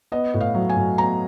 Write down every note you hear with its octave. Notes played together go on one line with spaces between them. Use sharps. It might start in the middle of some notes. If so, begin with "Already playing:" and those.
B3 D#5
A2
F5
F#3
G#5
A2
B3 A#5